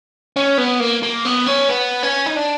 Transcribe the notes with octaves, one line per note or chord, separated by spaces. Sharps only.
C#4
B3
A#3
A#3
B3
C#4
B3
C#4
D#4
D4